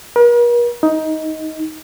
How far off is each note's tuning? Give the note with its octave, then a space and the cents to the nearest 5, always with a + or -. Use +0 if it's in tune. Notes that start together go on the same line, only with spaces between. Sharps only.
A#4 +45
D#4 +15